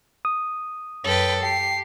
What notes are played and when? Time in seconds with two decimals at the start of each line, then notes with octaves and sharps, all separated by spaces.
0.25 D#6
1.04 F#2 A4 B4 C#5 G5
1.43 G4 G5 A5 C7 C#7